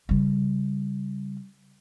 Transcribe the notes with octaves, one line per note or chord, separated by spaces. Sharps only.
C#3 G3